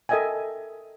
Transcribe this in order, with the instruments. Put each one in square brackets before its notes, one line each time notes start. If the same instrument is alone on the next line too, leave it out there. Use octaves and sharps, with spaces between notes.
[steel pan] A4 A#4 D#5 E5 G5 G#5